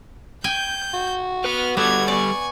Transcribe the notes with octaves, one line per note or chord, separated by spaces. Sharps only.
G5 G#5 G6
F#4
B4 F#5 F6
G3 B3 A4 D6 G#6
D5 G#5 C#6